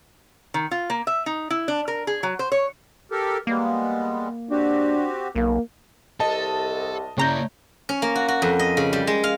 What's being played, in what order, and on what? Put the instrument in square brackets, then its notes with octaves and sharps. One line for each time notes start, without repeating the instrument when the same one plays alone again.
[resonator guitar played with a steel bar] D#3
F4
A#3
E5
D#4
E4
D4
A#4
G#4
F#3
C5
C#5
[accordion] G4 A4 A#4
[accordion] G3 G#3 B3 [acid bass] A#3
[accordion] C4 F#4 G4 [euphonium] D4
[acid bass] B1 [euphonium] A#3
[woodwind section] C2 [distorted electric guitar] A4 [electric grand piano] D#5 A5
[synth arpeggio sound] C#3 A#5 G6 [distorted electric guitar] A#3 E4 [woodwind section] C#5 D5
[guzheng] C#4
A#3
F#4
F#4
F2
D#5
C#3
G3
G#3
F5